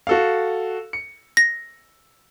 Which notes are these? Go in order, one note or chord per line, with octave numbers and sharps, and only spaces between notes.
F#4 A4 F5
C#7
A#6